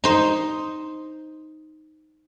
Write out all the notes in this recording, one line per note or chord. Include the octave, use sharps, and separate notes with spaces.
D#4 C5